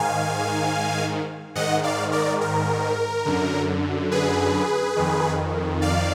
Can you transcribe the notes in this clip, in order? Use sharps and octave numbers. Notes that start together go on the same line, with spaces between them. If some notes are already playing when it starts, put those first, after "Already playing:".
Already playing: G#2 D#3 F5 G#5
G#2 D#3 D#5 F#5
D5 F5
A#4 D5
A#4
F#2 D3
G#4 B4
F2 D#3
D5 F5